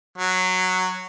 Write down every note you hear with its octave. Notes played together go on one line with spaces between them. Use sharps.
F#3